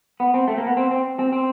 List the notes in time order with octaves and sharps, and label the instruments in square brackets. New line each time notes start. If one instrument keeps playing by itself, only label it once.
[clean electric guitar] B3
C4
A3
A#3
B3
C4
C4
C4
C4